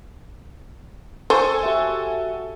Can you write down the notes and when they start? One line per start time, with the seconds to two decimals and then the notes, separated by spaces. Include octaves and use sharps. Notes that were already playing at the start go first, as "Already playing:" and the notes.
1.30 A4 C5 G#5 C#6
1.63 F#4 G4 E5